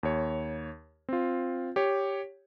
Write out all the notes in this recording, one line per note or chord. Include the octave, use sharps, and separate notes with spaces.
D#2 C#5
C4 F4
G4 C#5